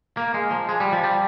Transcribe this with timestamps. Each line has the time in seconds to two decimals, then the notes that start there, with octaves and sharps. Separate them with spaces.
0.17 A#3
0.34 G#3
0.51 F3
0.69 G#3
0.80 G3
0.92 F3
1.04 G3